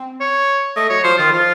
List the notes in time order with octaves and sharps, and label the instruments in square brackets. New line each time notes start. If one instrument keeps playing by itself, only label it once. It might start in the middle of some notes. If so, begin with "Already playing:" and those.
Already playing: [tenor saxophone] C4
[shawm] C#5
[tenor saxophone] A3 [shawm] D#5
[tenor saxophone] F#3 [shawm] C#5
[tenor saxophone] F3 [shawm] C5
[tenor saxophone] D#3 [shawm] F4
[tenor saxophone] F3 [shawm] F4